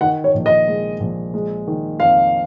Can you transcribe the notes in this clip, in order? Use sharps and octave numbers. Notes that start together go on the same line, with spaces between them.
D#3 F#5
C#5
A#1
D#5
G#3
A#1
G#3
D#3
F2 F5